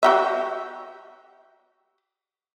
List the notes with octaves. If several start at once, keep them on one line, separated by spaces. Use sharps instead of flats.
F#4 G4 E5